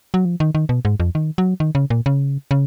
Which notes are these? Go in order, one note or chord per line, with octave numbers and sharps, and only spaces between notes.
F#3
F3
D#3
D#3
B2
G#2
F2
D#3
F#3
D#3
C#3
A#2
C#3
C#3